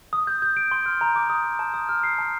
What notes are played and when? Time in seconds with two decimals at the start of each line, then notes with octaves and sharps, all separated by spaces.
0.13 D#6
0.27 G6
0.42 G6
0.57 D7
0.71 C6
0.86 F6
1.01 A#5
1.16 D6
1.30 D#6
1.44 G6
1.59 A5
1.74 D#6
1.89 F6
2.04 C7
2.18 A5